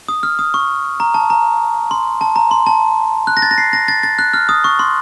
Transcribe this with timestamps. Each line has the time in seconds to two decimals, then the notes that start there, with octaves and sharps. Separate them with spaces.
0.08 D#6
0.23 F6
0.39 D#6
0.54 C#6
1.00 A#5
1.14 A5
1.30 A#5
1.91 C6
2.21 A5
2.36 A#5
2.51 C6
2.67 A5
3.27 F#6
3.37 A#6
3.42 A6
3.51 A#6
3.58 C7
3.73 A#6
3.88 A6
4.03 A6
4.19 F#6
4.34 F6
4.49 D#6
4.64 C#6
4.79 C6